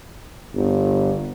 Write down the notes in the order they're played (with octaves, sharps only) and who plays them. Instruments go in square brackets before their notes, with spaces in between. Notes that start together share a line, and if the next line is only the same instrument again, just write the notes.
[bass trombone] G1